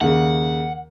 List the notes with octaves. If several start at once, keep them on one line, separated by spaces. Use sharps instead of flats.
D#2 C#3 F#5